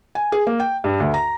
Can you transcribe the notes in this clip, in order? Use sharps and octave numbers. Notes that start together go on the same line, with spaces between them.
G#5
G#4
A#3
G5
G2
D2
A#5